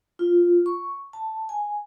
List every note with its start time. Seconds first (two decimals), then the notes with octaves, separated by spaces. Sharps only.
0.19 F4
0.66 C#6
1.13 A5
1.49 G#5